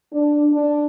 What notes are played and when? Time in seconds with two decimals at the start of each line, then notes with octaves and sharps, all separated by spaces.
0.13 D4
0.53 D4